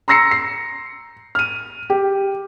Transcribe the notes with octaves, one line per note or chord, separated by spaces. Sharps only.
A#5 C6 E6 A#6 C7 C#7
C7
F6 D#7
G4